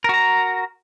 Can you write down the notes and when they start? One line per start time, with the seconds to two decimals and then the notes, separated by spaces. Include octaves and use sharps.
0.04 A#4
0.09 F#4
0.14 A#5